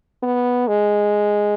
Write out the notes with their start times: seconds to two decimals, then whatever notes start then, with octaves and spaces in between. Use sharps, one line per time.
0.23 B3
0.68 G#3